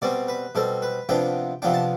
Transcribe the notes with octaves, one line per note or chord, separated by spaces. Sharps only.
B2 G3 C4 D5
B4
B2 G3 C4 A4
B4
C3 F3 B3 D4 G5
C3 F3 B3 D4 G5
A5